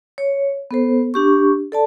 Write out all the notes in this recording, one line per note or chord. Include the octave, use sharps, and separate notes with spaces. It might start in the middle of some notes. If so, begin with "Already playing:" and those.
C#5
B3 A4 C5
D4 G4 C#6
A4 D5 A5